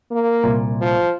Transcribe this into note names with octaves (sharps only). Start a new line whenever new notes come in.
A#3
C2 A#2
F3